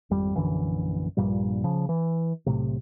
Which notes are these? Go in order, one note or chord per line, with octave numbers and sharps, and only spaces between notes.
G#1 F2 G3
A#1 F#2 D3 E3
A#1 G2 A#2 G3
C#3 F3
E3
B1 A2 C3